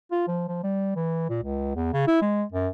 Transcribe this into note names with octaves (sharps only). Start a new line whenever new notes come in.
F4
F3
F3
G3
E3
A#2
C#2
E2
C#3
E4
G#3
F#2